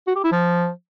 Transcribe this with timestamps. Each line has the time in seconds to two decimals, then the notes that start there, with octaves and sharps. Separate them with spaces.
0.07 F#4
0.16 G4
0.24 E4
0.32 F3